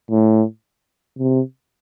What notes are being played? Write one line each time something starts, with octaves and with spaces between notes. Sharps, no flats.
A2
C3